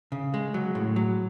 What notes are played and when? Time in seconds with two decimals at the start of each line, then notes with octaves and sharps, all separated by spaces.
0.12 C#3
0.34 G#3
0.54 F#3
0.75 A2
0.96 F#3